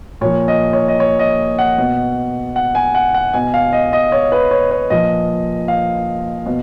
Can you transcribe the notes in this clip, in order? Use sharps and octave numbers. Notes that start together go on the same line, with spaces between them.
A#2 F3 C#5
D#5
C#5
D#5
C#5
D#5
F#5
B2
F#5
G#5
F#5
F#5
B2 G#5
F5
D#5
D#5
C#5
B4
C#5
C#5
A#2 F3 D#5
F5
B2